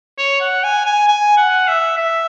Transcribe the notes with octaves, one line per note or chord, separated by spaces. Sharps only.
C#5
F#5
G#5
G#5
G#5
F#5
E5
E5